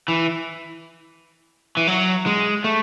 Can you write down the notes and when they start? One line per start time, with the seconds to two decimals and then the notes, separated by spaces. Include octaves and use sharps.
0.08 E3
1.77 E3
1.87 F#3
2.26 G#3
2.64 A3